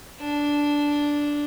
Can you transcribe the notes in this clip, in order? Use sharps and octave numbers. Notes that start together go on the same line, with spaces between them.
D4